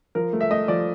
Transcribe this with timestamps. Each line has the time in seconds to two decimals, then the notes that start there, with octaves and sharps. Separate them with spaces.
0.15 F3 A#4
0.33 A3
0.41 E5
0.50 A3 D#5
0.68 F3 D5